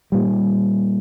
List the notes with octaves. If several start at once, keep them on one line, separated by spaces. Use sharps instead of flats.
A#2 G3